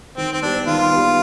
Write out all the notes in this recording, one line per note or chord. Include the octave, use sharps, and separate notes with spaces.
D#3 C4
C4
G3 B3 D4
D#3 F4
G3 B3